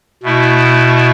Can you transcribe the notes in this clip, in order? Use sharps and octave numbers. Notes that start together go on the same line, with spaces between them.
B2 A3 E4